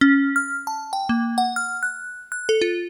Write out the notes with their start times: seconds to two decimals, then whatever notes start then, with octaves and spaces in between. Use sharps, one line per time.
0.01 C#4
0.36 F6
0.67 A5
0.93 G5
1.09 A#3
1.38 F#5
1.56 F6
1.83 F#6
2.32 F#6
2.49 A4
2.62 F4